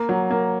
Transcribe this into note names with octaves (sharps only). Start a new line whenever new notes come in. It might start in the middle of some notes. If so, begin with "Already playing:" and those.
Already playing: A#3
F#3
A#3